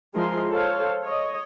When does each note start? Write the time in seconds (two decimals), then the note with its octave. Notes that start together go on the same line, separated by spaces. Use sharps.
0.13 F3 G#3 E4 G#4 A#4 C6
0.49 A4 C5 C#5 F5
1.03 C#5 D#5